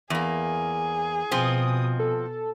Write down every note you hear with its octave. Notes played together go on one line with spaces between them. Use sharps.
E2 A#3 G#4
B2 F3 C4 D#6
A4